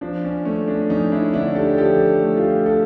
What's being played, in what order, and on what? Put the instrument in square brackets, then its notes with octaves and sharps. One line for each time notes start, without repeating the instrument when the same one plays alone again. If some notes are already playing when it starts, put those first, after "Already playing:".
[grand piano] F3 D4
C#4
A3 C#4
D4
F2 C#4 D#4
D4 E4
D3 D4 E4
G4 A4
F3 G4 A4
A3
F4 G4
G4 A4